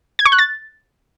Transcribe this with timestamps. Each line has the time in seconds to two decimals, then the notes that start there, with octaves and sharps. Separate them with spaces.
0.19 G#6
0.25 C#6
0.32 F#6
0.39 A6